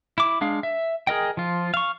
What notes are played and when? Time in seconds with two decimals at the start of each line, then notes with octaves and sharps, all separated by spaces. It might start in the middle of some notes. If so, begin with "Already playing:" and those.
0.18 E4 D6
0.41 G#3 D4 F5
0.63 E5
1.07 G#4 A#4 D#5 G5
1.37 F3 F4
1.74 F5 C#6